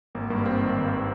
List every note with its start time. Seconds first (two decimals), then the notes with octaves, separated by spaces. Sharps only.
0.15 G#1 A#3
0.30 G2 A#3
0.46 A#3 C4
0.60 D#3
0.76 G#1